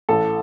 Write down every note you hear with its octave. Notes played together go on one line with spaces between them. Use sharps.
A1 A4